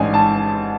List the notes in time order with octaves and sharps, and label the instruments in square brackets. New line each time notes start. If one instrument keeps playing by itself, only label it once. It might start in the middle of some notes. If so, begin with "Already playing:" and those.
Already playing: [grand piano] A1 G#2 G#3 D4 G#5
A5